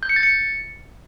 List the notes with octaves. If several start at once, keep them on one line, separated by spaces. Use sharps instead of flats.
G6
C#7
A6
C#7